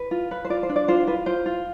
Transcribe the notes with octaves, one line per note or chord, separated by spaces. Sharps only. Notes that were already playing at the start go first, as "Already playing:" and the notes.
Already playing: B4
F4
B4
C5
F4 D5
C5
D4
D5
F4 C5
F4 B4
F4 C5
F4